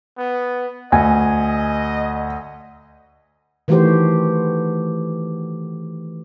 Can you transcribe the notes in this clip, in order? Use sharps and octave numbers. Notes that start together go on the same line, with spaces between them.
B3
D2 D#5 G#5
D#3 E3 A3 F#4 G4 C5